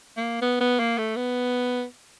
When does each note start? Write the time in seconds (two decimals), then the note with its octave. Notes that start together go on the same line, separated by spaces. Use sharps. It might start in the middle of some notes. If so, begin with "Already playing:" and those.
0.17 A#3
0.41 B3
0.60 B3
0.79 A#3
0.98 A3
1.16 B3